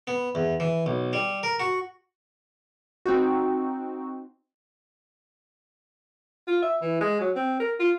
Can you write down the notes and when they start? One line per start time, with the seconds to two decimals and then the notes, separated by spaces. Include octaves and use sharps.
0.07 B3
0.35 E2
0.60 E3
0.86 B1
1.13 G3
1.43 A#4
1.60 F#4
3.06 C4 D#4 F#4
6.48 F4
6.62 E5
6.82 E3
7.01 G#3
7.20 F#3
7.36 C4
7.60 A#4
7.80 F4